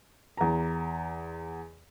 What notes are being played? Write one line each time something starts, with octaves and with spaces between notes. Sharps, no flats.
E2 A#5